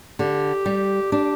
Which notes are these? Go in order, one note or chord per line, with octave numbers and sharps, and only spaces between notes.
D3 G4
G3
D4 G4